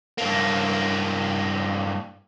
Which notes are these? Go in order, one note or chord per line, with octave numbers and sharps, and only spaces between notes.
G2 A#3